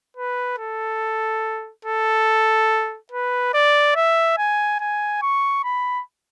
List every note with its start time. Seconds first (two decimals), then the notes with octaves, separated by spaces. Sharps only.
0.17 B4
0.58 A4
1.85 A4
3.12 B4
3.54 D5
3.96 E5
4.38 G#5
4.80 G#5
5.22 C#6
5.64 B5